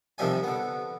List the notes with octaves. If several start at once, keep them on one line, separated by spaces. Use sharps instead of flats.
C3 D#3 F3 G3 E5 G#5
D3 B3